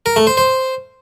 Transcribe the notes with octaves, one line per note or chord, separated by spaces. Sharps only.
A#4
A3
C5
C5